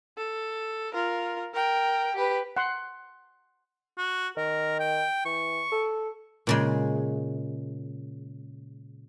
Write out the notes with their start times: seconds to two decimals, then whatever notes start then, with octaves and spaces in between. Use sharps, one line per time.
0.18 A4
0.93 F4 A#4
1.54 A#4 G5
2.15 G4 B4
2.56 F#5 C6
3.98 F#4
4.37 D#3 A#4
4.80 G5
5.25 E3 C#6
5.72 A4
6.47 A#2 C#3 G#3